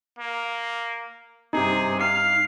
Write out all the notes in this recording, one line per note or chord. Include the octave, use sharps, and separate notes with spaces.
A#3
G2 C3 D#4 G#4
F5 F6 C7